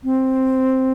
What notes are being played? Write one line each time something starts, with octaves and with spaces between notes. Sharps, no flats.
C4